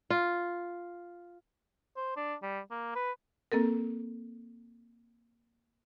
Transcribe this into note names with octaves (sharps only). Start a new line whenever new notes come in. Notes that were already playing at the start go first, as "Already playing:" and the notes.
F4
C5
D4
G3
A#3
B4
A#3 C4 A4 A#4